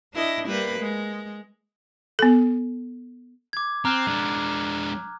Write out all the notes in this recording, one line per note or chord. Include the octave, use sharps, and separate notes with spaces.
D4 E4 D#5
G3 A#3 B4
G#3
B3 A4
D6 G#6
C4 A#5 F6 F#6
G#3 D4